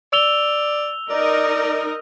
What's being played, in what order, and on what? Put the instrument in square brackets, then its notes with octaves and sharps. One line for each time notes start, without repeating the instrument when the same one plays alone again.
[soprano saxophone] D5 [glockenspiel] E6 F7 G7
[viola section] D#4 A#4 D#5 [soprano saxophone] D5